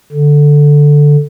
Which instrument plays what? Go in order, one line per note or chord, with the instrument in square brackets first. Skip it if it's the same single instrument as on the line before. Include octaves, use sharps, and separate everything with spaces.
[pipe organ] D3